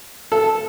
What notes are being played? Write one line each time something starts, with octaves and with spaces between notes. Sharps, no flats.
A4